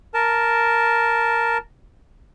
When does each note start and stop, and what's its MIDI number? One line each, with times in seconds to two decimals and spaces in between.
0.14 1.58 70
0.14 1.58 81